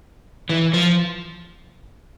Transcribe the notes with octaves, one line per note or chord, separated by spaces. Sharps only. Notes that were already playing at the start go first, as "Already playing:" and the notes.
E3
F3